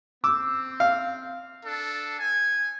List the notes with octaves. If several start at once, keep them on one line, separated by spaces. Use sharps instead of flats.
C4 D6 E6
F5
D4 A4
G#5